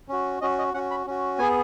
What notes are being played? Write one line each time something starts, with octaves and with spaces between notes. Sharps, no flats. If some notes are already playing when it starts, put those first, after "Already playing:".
C#4 F#4
C#4 F#4 D#5
D#5
C#4 F#4 F#5
B5
C#4 F#4
B3 G#4 G#5